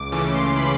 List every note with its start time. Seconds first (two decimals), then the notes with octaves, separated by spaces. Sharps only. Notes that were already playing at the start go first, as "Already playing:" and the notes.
Already playing: C#2 D6
0.12 C#3 E3 A3 C#4 D6
0.34 C6
0.57 B5